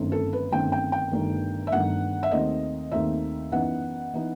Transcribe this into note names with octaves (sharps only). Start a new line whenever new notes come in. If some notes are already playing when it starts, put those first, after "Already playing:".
Already playing: G1 F#2 D#3 A3 C4
A4
B4
G1 F#2 D#3 A3 C4 G5
G5
G5
G1 G2 D#3 A3
E5
G1 G2 D#3 A3 F#5
E5
D#2 D#3 A3 C4 D#4 D#5
D#2 D#3 A3 C4 D#4 E5
F#2 E3 B3 D#4 F#5
E3 B3 D#4